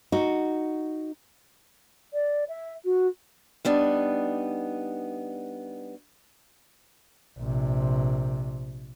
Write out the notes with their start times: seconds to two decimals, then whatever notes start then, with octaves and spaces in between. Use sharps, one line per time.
0.12 D#4 F#4
2.14 D5
2.49 E5
2.85 F#4
3.65 G3 B3 D4 D#4
7.39 A#1 C3